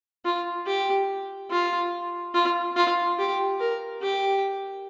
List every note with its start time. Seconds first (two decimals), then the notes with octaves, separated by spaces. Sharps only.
0.25 F4
0.66 G4
1.51 F4
2.34 F4
2.76 F4
3.18 G4
3.60 A#4
4.02 G4